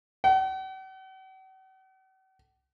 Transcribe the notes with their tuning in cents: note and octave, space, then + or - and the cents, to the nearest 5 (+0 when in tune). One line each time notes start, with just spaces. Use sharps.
F#5 +45